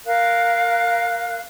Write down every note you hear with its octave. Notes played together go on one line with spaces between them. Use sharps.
A#4 F5 F#6